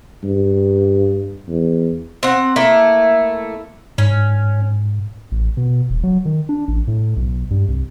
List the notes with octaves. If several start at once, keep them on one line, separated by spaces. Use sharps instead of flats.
G2
E2
C4 F#5
A3 A#3 E4
G#2 C#4
A1
B2
D#1
F#3
D#3
D4
A1
A2
B1
G2
C2